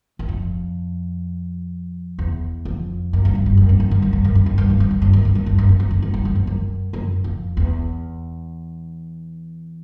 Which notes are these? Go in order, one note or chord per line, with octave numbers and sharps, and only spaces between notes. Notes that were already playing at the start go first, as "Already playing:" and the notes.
F#2
F2
E2
F2
F#2
G2
F#2
G2
F#2
G2
F#2
G2
F#2
G2
F#2
G2
F#2
G2
F#2
G2
F#2
G2
F#2
G2
F#2
G2
F#2
G2
F#2
G2
F#2
G2
F#2
G2
F#2
F#2
F2
E2